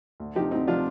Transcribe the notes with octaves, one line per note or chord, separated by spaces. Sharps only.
D2
C3 F3 D#4 G4
D2 C4 D#4
C3 F3 D4 F4